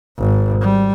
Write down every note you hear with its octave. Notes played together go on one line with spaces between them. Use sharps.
G#1
G3